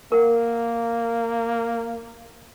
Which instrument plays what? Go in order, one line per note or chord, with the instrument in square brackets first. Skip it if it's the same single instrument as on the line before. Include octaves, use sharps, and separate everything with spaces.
[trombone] A#3 [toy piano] A#4 F#5